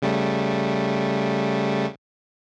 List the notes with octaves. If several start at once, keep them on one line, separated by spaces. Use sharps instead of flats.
C#3 G3 A3